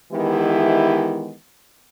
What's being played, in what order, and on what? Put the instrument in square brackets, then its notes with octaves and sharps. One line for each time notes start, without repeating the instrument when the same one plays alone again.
[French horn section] D#3 E3 G#3 B3 E4 G4